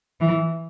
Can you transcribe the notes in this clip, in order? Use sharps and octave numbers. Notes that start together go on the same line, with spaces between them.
E3